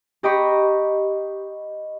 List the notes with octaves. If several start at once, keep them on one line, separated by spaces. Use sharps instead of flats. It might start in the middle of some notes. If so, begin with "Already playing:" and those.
G4 D#5 G5 A#5 B5 C#6